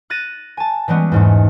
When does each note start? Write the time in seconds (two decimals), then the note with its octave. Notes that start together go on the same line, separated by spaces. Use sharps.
0.10 F#6 A6 A#6 D#7
0.57 G#5 A5
0.88 E3 G3 G#3 B3 C#4
1.12 E2 G#2 A3